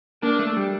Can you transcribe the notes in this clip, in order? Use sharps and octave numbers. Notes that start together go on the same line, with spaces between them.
A#3 D4
A3
G3